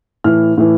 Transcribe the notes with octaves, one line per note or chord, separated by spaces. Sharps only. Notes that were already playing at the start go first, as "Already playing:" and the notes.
A2 E3 F6
A2 E3